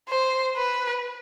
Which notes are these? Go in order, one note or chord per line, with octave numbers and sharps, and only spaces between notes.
C5
B4